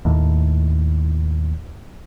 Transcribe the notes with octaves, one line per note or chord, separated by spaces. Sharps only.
D#2 A2